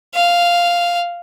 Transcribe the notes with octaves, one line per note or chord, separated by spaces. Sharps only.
F5